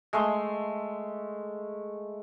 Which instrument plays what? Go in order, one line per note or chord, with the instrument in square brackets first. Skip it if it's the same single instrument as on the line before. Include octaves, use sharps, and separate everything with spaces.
[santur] G#3 A3 E5 C6